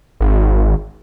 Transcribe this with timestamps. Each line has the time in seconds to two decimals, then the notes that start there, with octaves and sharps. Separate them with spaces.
0.20 G#1